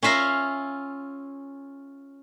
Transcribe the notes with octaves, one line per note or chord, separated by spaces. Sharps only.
C#4 F4 E5 F5 A#5